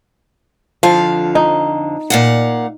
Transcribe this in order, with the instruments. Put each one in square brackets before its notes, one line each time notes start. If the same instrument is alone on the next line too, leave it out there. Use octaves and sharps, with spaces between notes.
[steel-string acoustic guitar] F2 D3 F5 [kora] F3
[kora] D#4
[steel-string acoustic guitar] A#2 F5 F#5